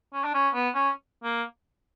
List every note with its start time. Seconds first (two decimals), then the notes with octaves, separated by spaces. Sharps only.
0.13 C#4
0.24 D4
0.34 C#4
0.55 B3
0.75 C#4
1.23 A#3